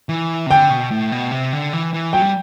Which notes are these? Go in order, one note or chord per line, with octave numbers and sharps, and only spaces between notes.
E3
C3
D3 G5
B2
A2
B2
C3
D3
E3
E3
F#3 G5
G3